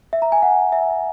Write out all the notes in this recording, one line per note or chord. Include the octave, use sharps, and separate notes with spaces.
E5
A#5
G#5
F#5
E5